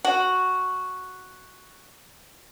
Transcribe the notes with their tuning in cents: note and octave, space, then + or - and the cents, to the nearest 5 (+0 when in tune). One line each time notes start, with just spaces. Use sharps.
F#4 +0